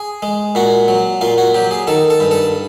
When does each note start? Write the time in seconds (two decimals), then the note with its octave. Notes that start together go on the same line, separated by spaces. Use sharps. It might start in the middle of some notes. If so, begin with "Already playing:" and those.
Already playing: G#4
0.22 G#3
0.55 A#2 F#4
0.88 F#3
1.21 A#2 F4
1.38 F#4
1.54 F#3 G4
1.71 G#4
1.87 D#3 A4
2.10 A4
2.20 G2
2.31 A4